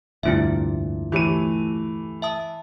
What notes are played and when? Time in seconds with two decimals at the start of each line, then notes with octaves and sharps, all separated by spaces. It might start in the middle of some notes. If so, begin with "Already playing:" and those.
0.23 F1 D2 G2 A#2 E4 F4 E5
1.12 E3 A3 G4 C#5 D#7
2.22 E5 A5 D#6